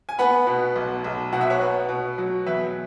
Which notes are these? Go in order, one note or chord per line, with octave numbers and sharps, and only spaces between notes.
G#5
B3 F#5 B5
B2
B1
B1
B2 F#5
E5
C#5 F#5
B3
B2
F#3
E2 B4 E5